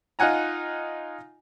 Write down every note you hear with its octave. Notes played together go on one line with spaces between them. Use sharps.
D#4 F4 F#5 G#5 A#5